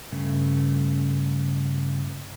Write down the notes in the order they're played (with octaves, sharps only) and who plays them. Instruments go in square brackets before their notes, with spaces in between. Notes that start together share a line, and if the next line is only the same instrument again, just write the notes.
[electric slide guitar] G2 C#3 A3